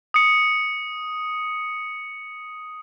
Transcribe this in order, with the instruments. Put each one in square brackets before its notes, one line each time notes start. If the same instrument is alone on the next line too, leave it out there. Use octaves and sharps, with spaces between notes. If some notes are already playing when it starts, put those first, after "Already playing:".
[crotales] D#6 C#7